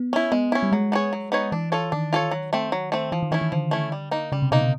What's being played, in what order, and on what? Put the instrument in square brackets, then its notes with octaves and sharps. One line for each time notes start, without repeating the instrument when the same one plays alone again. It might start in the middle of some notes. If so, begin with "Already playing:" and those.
Already playing: [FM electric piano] B3
[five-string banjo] C#4 E4
[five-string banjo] G#3 [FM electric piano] B3
[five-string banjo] C#4 E4
[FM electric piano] G3
[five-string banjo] F#3 [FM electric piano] G#3
[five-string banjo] B3 D#4 G#4 C#5
F#3
B3 D#4 G#4 C#5
[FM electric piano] E3 [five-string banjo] D4
[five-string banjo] F4 A4 C#5
[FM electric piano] D#3 [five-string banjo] D4
[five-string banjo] F4 A4 C#5
F#3
A3 C4
F#3
A3 C4
[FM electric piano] E3 [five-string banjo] F3
[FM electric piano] D#3
[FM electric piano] E3 [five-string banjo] A3 C#4 E4
[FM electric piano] D#3
[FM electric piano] D3 [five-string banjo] F3
[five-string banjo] A3 C#4 E4
G3
A#3 D#4
[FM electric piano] C#3 [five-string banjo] G3
[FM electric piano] C3
[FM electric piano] B2 [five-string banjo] A#3 D#4
[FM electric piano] C3